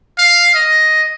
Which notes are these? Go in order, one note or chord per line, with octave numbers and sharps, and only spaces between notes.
F5
D#5